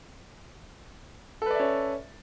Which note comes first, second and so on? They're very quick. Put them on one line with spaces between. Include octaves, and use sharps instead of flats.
A4 B4 D5 E5 C#4